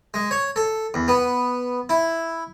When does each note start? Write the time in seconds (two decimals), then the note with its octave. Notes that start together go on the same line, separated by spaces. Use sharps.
0.14 G#3
0.31 C#5
0.56 A4
0.94 E2
1.08 B3
1.89 E4